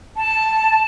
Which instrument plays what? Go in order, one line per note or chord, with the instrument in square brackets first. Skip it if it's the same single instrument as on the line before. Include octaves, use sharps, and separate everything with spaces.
[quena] A5